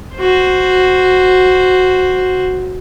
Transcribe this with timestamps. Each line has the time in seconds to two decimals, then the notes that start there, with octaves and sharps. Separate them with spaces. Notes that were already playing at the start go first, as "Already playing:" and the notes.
0.15 F#4 C5